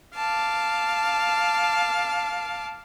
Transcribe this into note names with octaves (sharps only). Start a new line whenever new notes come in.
F5 A5 D6